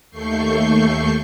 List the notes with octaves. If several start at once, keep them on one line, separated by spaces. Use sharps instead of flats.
D#2 A3 C#6 G6 C7